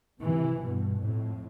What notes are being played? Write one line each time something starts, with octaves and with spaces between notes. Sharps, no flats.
C3 E3
G2 B2
F2 A2